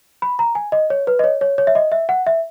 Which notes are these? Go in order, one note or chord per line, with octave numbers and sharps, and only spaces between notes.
B5
A#5
G#5
D#5
C#5
B4
D#5
C#5
C#5
C#5
E5
D#5
E5
F#5
E5